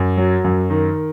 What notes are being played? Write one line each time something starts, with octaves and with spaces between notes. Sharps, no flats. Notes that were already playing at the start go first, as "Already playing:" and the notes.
Already playing: F#2
F#3
F#2
D#3